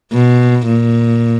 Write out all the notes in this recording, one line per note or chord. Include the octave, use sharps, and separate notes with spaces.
B2
A#2